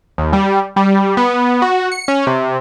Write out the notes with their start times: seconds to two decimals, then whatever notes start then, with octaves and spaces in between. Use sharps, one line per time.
0.18 D#2
0.33 G3
0.76 G3
1.17 B3
1.62 F#4
1.92 C#7
2.08 C#4
2.27 C3